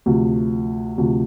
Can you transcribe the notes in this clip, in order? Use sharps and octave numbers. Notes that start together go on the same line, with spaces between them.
D2 C3 F3
D2 C3 F3